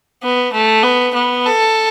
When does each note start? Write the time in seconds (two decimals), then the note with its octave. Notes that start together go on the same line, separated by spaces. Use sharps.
0.23 B3
0.53 A3
0.84 B3
1.14 B3
1.46 A4